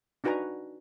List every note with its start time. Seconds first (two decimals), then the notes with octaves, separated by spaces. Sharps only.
0.24 D4 D#4 F#4 B4 G#5 A#5